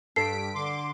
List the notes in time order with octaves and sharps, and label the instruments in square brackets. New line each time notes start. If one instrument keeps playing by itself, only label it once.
[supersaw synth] G2 B6 D7 [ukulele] A4 [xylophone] C7
[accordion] D3 C6 [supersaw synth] D6